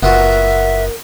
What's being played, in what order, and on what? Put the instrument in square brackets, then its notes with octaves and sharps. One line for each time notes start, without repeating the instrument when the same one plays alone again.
[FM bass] F#1 [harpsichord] B3 F4 F#4 [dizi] A#4 [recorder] E5